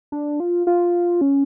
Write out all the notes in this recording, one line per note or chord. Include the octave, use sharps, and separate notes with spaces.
D4
F4
F4
C#4